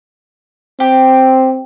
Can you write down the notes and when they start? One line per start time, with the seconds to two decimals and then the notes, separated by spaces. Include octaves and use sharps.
0.80 C4 G4